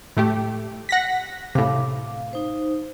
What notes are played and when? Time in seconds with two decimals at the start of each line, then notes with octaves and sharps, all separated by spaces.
0.17 A2 A3 G4
0.89 F#5 A#6 B6
1.55 A2 C3 F5 D6
2.33 D#4 C5